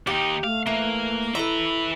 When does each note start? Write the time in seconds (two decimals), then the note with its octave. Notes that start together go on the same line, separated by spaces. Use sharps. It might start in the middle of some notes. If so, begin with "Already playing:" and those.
0.07 D#2 D#4 G4
0.44 A3 F5
0.67 E3 A#3
1.35 E4 A4 B4 E5 A#5